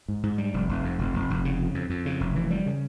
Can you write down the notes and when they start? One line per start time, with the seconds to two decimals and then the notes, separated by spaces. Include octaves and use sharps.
0.08 G#2
0.23 G#2
0.38 G3
0.54 F1
0.69 F1
0.84 F2
0.99 F1
1.14 F1
1.30 F1
1.45 C#3
1.59 F2
1.74 F2
1.90 F2
2.06 C#3
2.21 F1
2.35 E3
2.51 G3
2.66 C#3